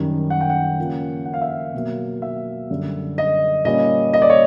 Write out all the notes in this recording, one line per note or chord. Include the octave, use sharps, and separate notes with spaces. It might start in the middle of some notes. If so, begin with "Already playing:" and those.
Already playing: F#2 D#3 G3
F#5
G5
F#5
C#3 F3 A#3 C#4
F#5
F5
E5
F5
B2 F#3 A#3
E5
F#2 D3 G3
D#5
A#2 G3 A#3 C#4 D#5
D#5
D5
C#5